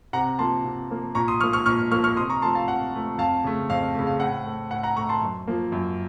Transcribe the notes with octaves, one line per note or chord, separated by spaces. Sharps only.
C3 F#5 A#5
F3 A#3 A5 C6
C3
F3 A#3
A#2 A#5 C#6
C6 D#6
F3 A#3 C#6 F6
C#6 F6
A#2 C#6 F6
F3 A#3 C#6 F6
C#6 F6
C3 C6 D#6
A#5 C#6
F3 A3 A5 C6
F5 A5
C3 F#5
F3 A3
F2 F5 A5
C#3 A3
F2 F5
C#3 A3
F5
A2 F#5
A3
A2 F#5
F#5 A#5
A3 A#5 C#6
A5 C6
F#2
F3 A#3
F#2